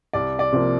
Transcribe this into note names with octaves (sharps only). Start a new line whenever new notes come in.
C2 D5
D5
C3 F3 A#3